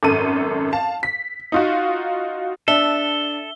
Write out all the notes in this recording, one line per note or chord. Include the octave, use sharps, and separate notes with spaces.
G#1 F#2 A4 D#7
F5 A5
B6
D#4 F4 F#4
D4 A4 E5 G7